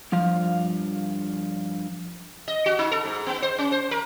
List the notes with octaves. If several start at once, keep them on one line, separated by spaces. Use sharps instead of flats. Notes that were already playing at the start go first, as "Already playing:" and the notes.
G2 F3 F5
D#5
F#4
D#4
A4
G#2
B3
C5
C#4
C5
A#4